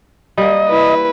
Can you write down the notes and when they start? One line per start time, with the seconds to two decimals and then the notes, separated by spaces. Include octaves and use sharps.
0.38 G3 A#3 D#5
0.68 E4 B4